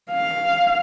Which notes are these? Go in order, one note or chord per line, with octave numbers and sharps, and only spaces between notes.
F5